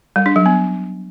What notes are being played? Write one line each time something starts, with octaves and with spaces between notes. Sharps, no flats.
G3
D4
F#3
B3